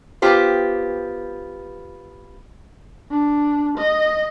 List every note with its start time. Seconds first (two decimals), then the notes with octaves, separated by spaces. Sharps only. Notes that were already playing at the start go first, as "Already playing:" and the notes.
0.22 B3 F4 G4 C5
3.11 D4
3.78 D#5